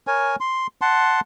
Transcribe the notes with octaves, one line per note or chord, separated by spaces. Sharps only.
A#4 C#5 G#5
C6
F#5 A5 C6